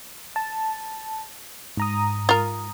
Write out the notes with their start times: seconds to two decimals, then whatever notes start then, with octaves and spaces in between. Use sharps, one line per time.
0.36 A5
1.77 G#2 A#5 D#6
2.29 F4 A#4